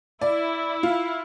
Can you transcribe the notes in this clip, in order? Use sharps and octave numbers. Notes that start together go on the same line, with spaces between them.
E4 D5
F4